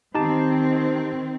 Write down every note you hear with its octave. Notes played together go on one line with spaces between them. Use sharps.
D#3 C4 D#4 G4 A5